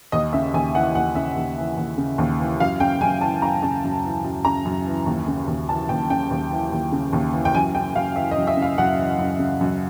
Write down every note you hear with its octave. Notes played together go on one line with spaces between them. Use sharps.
D#2 D#5
C#3 E5
D#2 G#5
E3 F#5
D#2 F#5
C#3 E5
D#2
E3
D#2
C#3
D#2
E3
F#2 F5
C#3 G5
F#2 G#5
E3 A5
F#2 A#5
C#3 A5
F#2
E3
F#2
C#3 A#5
F#2
E3
D#2
C#3
D#2
E3 A5
D#2 G5
C#3 G5
D#2
E3
D#2
C#3
D#2
E3
G5
F#2 G#5
C#3 G5
F#2 F5
E3 E5
D#5
F#2
E5
C#3
F5
F#2 F#5
E3
F#2
C#3
F#2